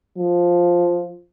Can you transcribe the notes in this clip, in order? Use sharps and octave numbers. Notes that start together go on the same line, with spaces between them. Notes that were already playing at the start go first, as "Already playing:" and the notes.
F3